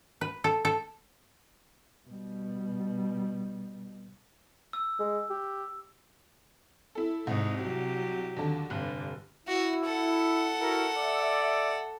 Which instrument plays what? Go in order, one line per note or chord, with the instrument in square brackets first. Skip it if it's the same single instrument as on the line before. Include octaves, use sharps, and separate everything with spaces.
[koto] B4
A4
A4
[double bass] B2 G3
[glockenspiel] E6
[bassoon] G#3
G4
[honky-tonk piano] E4 A4
[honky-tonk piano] C2 [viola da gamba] G#2 D#4
[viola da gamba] F#3 G4
[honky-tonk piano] D#2 D3 A5
[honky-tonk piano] F1 F#6 [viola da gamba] G2 D3
[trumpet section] E4 [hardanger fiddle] F#4
[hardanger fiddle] A4 F#5
[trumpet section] E4 F#4 A#4
D5 E5